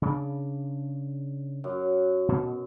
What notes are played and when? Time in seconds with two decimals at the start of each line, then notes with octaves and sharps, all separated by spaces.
0.02 C#3 C4 D4
1.64 F#2
2.28 B2